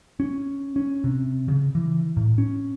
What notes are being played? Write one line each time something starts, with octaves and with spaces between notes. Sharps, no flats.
C#4
C#4
C3
C#3
E3
A2
C#4